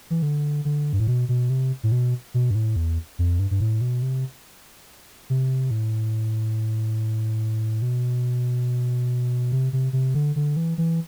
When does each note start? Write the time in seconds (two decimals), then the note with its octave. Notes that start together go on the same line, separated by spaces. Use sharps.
0.10 E3
0.22 D3
0.65 D3
0.93 G2
1.00 A2
1.07 B2
1.29 B2
1.50 C3
1.83 A2
1.92 B2
2.34 B2
2.51 G2
2.55 A2
2.76 E2
3.19 F2
3.39 G2
3.51 G2
3.60 A2
3.81 B2
4.02 C3
5.30 C3
5.71 A2
7.82 B2
9.52 C3
9.73 C3
9.93 C3
10.14 D3
10.36 D3
10.57 E3
10.78 E3